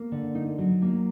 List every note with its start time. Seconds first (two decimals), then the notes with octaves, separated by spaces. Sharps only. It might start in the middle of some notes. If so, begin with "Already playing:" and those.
Already playing: A#3
0.12 D3
0.35 D#4
0.58 F#3
0.82 A#3